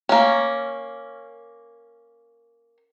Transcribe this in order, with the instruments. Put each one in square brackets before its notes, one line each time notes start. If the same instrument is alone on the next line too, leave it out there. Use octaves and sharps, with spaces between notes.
[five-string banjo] A#3 C#4